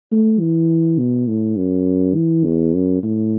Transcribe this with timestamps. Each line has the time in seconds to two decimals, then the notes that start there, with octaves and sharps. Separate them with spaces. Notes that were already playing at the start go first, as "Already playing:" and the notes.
0.11 A3
0.40 E3
0.98 B2
1.28 A2
1.57 F#2
2.15 E3
2.45 E2
2.74 F#2
3.03 A2